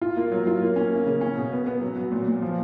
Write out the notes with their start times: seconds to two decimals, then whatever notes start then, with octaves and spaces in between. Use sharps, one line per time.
0.01 F4
0.17 A#3
0.32 F#3
0.47 F4
0.62 A#3
0.76 C#4
0.91 A#3
1.06 C#3
1.21 C#4
1.37 B2
1.52 B3
1.66 B3
1.81 F#3
1.96 F#3
2.12 A#2
2.27 A#2
2.42 F3